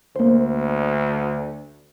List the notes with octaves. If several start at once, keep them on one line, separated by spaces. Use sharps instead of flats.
D2 A#3 C5